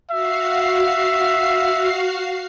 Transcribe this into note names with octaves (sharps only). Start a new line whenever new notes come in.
F#4 E5 F5 C7